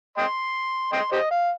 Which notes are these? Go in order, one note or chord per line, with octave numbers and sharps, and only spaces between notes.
D#5 G5 C6
D#5 G5 C6
G4 C5 D#5
F5